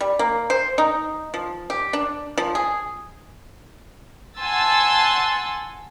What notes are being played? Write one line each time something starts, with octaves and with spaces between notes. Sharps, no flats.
G3
A#3
C5
D#4
F3
G4
D4
F3
G#4
F#5 G#5 A5 C6 E6 A6